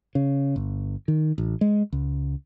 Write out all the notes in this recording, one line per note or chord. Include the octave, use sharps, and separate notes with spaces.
C#3
G1
D#3
A1
G#3
C#2